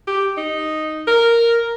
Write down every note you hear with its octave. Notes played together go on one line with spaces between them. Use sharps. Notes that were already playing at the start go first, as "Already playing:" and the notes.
G4
D#4
A#4